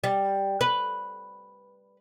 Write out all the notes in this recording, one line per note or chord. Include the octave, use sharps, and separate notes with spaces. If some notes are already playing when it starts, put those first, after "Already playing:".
G3
B4